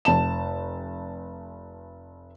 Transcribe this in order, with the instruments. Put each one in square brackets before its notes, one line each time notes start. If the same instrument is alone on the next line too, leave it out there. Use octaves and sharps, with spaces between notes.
[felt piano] F1 A5 E7